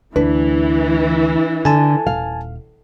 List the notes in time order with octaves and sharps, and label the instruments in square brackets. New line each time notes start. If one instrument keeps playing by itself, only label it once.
[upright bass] D2 [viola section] E3 [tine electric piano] D4 [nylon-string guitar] B4
[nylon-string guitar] D3 [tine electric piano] G#5 A5
[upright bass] D#1 [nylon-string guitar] F5